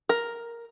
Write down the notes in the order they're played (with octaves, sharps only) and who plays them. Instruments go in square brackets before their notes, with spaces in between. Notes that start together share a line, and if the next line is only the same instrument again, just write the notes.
[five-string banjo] A#4